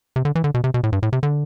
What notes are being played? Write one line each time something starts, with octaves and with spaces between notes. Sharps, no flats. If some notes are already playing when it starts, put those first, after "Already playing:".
C3
D3
E3
D3
B2
C3
B2
A2
G2
A2
C3
D3